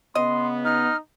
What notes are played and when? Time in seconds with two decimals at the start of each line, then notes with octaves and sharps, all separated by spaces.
0.15 C#3 B3 D#5 C6
0.65 D#4 F6